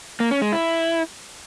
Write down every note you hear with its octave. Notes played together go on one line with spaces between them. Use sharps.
A#3
C#4
G#3
E4